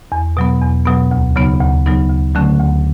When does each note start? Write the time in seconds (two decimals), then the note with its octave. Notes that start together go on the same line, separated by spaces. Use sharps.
0.12 E2
0.37 B2 F#3 B3
0.62 E2
0.85 B2 F#3 B3
1.11 D2
1.36 C#3 F#3 B3 D#4
1.61 D2
1.86 C#3 F#3 B3 D#4
2.10 D2
2.35 D3 F#3 A3 C#4
2.59 D2